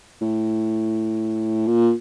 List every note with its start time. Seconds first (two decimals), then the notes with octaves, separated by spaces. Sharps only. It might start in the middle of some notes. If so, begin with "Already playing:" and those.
0.21 A2
1.66 A#2